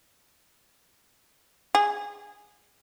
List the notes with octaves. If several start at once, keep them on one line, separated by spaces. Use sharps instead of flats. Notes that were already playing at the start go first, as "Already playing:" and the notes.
G#4